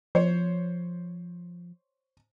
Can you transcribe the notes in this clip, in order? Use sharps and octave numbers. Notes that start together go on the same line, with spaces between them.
F3 C5 C#5